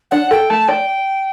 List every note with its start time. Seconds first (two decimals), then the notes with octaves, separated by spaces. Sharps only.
0.11 D4 F#5
0.31 A4 G5
0.50 A3 A5
0.68 D5 G5